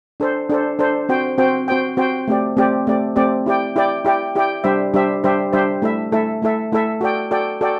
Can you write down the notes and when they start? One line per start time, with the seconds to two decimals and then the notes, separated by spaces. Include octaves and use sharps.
0.20 D4 A4 C5
0.50 D4 A4 C5
0.79 D4 A4 C5
1.09 C4 F#4 C5 G5
1.38 C4 F#4 C5 G5
1.68 C4 F#4 C5 G5
1.97 C4 F#4 C5 G5
2.28 A3 C4 G4 D5
2.57 A3 C4 G4 D5
2.87 A3 C4 G4 D5
3.16 A3 C4 G4 D5
3.46 E4 G4 D5 G5
3.76 E4 G4 D5 G5
4.05 E4 G4 D5 G5
4.35 E4 G4 D5 G5
4.64 G3 D4 G4 C5 E5
4.94 G3 D4 G4 C5 E5
5.24 G3 D4 G4 C5 E5
5.53 G3 D4 G4 C5 E5
5.82 A3 E4 A4 E5
6.12 A3 E4 A4 E5
6.42 A3 E4 A4 E5
6.72 A3 E4 A4 E5
7.01 F#4 A4 D5 G5
7.31 F#4 A4 D5 G5
7.61 F#4 A4 D5 G5